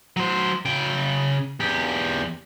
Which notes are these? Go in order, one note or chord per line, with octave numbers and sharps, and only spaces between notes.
F#3 C5
C#3 G5
E2 G4